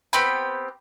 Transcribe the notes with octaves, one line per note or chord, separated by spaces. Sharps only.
B3 C4 G4 B5